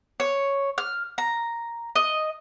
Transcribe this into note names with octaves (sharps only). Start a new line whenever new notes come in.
C#5
F6
A#5
D#5